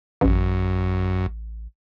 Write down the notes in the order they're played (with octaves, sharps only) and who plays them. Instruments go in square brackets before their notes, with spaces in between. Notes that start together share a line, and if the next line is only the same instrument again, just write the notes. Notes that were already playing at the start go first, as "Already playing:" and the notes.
[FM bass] A1 [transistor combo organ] F#2